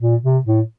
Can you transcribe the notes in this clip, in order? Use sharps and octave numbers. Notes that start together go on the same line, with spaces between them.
A#2
C3
A2